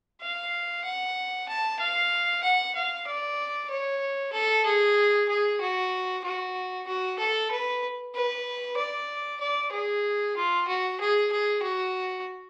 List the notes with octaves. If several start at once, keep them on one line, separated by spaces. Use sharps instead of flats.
F5
F#5
A5
F5
F#5
F5
D5
C#5
A4
G#4
G#4
F#4
F#4
F#4
A4
B4
B4
D5
D5
G#4
F4
F#4
G#4
G#4
F#4